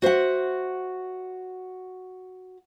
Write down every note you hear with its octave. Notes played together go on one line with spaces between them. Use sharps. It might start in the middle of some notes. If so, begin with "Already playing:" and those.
F#4 C5 E5 F#5